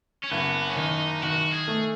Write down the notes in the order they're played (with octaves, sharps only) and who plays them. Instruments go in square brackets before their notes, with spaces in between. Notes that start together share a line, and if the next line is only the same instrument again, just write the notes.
[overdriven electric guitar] C#4
[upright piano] F#1 [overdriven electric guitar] B3
[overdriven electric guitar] C#4
[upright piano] D#3 [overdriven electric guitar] D#4
[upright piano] D#3 [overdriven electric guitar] F#4
[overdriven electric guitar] G#4
[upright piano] A3